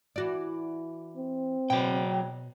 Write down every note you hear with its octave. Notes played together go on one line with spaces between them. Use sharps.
E3 F#4 D5
C4
B2 F#3 G5